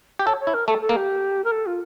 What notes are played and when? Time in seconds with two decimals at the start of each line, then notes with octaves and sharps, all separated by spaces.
0.19 G4
0.26 A4 C#5
0.40 C#5
0.47 E4
0.54 A#4
0.67 A3 A4
0.81 A4
0.89 A#3
0.96 G4
1.44 A#4
1.51 A4
1.66 F4